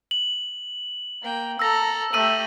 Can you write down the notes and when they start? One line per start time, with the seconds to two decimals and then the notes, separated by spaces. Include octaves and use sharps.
0.11 F#7
1.23 A#3 G5
1.59 A4 A#5 E6 A#6
2.13 A3 G4 E6 D#7 F#7